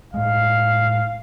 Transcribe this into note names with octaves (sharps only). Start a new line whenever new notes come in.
A2 G#3 F5